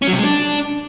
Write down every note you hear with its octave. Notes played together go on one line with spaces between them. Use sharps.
C#4
F#3
C3
G#3
D4